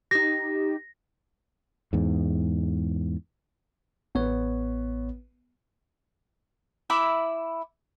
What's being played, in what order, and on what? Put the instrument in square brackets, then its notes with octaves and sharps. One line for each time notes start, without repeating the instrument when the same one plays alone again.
[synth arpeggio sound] D#4 G4 [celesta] A#6
[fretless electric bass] E2 G#2
[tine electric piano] A1 C#5 [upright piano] B3
[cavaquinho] E4 E5 B5 D6